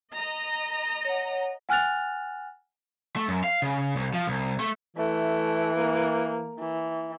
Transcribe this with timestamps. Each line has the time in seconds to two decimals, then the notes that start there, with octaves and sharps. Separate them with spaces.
0.13 D#5 A#5
1.05 C#5 F#5
1.69 F#5 G#5 F6 F#6 A6 F7
3.16 A3
3.28 F#2
3.44 F5
3.62 C#3
3.96 C2
4.14 F3
4.27 C2
4.60 A3
4.96 E3 A3
5.77 A#3
6.59 E3